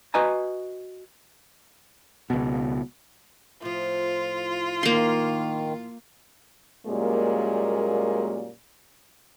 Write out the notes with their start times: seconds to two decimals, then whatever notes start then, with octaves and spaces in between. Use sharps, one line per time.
0.14 F#4 B4 D#5 G#5 A#5
2.30 C#2 B2
3.62 A2 F3 F4
4.83 D#3 A#3 C6
6.86 F#2 A#2 G3 G#3 A#3